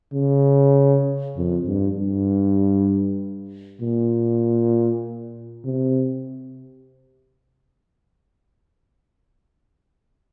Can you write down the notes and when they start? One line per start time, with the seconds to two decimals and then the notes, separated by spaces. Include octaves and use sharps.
0.13 C#3
1.36 F2
1.66 G2
1.97 G2
3.81 A#2
5.65 C3